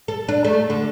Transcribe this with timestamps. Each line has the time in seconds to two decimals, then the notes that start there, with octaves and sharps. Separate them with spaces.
0.08 A4
0.28 D4
0.45 A3
0.70 D3